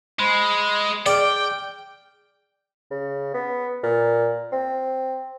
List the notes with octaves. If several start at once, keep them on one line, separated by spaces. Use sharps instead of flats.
G#3 C5 B5 C6
G#4 D5 G5 D6 F6
C#3
B3
A#2
C4